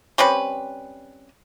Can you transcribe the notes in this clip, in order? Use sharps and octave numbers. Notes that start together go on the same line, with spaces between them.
G3 C4 C#4 B4